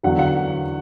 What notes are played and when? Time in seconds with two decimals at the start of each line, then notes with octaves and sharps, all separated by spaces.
0.03 E2 D3 F#3 F#5
0.19 F#5